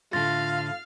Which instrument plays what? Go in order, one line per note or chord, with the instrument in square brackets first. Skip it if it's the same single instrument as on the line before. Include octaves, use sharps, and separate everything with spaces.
[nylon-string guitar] A2 D3 [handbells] F4 C6 A#6 [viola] F5 [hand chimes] A6